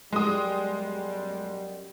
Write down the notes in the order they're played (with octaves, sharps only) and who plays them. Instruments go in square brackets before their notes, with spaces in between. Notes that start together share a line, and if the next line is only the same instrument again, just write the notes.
[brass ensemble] F#2 B2 G3 [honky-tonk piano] G#3 D#6